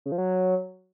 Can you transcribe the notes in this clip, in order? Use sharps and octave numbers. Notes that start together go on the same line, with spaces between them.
C#3
F3
F#3